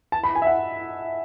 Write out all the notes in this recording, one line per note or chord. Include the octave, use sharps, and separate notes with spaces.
A5
B5
G#5
E5
F#5